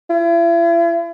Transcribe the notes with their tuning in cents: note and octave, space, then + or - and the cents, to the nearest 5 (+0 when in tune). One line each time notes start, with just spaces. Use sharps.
E4 +40